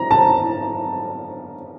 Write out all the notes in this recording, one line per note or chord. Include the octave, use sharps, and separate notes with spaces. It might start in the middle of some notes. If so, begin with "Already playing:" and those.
Already playing: A#5
A5